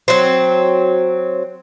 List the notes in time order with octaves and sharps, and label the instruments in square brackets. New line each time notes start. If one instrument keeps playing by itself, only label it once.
[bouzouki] F#3 C4